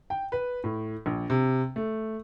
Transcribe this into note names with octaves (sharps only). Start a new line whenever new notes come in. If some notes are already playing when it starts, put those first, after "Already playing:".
G5
B4
A2
A#1
C3
A3